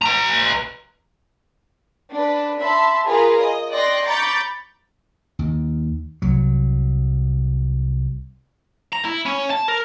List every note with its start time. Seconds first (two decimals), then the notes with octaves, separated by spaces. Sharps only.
0.02 B4 A#5
2.10 D4 B4
2.60 E5 A5 B5 C6
3.06 F4 G#4 A#4 B4
3.39 D#5
3.71 D5 D#5 G5 C6 F#6 A#6
4.06 A#5 B5 C#6 D6 G6 A6
5.39 D#2
6.22 C2 F#3
8.93 A#5
9.05 E4
9.26 C#4
9.50 A5
9.68 A#4